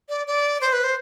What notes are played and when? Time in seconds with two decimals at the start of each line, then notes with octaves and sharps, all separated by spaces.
0.09 D5
0.27 D5
0.61 C5
0.73 B4
0.84 C5